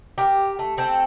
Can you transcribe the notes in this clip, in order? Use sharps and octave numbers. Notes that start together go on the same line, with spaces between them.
G4 A#4
A3
A3 C4 A4